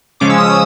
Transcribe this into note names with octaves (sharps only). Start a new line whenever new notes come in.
C#3 F3 G#3 C#4 D6
E6
D#6
E6